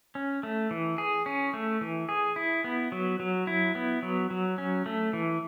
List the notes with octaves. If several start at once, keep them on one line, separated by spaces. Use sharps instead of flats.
C#4
A3
E3
G#4
C#4
A3
E3
G#4
E4
B3
F#3
F#3
E4
B3
F#3
F#3
C#4
A3
E3